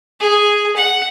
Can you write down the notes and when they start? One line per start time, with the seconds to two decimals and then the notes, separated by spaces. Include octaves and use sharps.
0.20 G#4
0.76 F#5